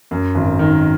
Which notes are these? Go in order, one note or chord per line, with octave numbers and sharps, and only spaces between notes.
F#2
G#1
D#3